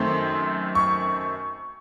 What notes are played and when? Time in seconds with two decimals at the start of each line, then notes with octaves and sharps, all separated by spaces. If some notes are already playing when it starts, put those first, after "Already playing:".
Already playing: F#2 D#3 A3 C4 C6
0.75 C#6